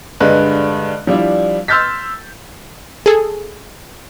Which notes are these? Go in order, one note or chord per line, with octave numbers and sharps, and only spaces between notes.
G2 D3 G#3 B4 F#6
F3 G3 D4 E4
C6 E6 F6 G6 A6 B6
G#4 A4